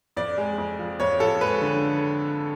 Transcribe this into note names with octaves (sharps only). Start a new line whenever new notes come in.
F2 D5
G#3
F2
F3
F2 C#5
F3 A4
G#3 B4
D3